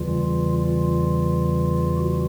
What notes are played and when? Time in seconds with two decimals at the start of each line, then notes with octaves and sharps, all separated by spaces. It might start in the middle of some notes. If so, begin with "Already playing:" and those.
Already playing: E2 C#3 E3 G3 F4
0.55 F4
1.97 F#4